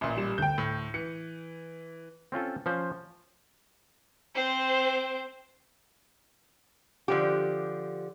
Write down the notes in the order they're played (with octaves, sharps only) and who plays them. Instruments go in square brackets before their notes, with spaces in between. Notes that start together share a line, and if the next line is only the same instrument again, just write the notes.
[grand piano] A1 A#2 [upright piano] E5
[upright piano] G3 E7
[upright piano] D2 [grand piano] G5 G6
[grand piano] A2
[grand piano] E3 [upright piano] C#7
[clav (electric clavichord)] C4 C#4 F4 A4
F3 C#4 C5
[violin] C4 C5
[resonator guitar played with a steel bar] D3 F3 G4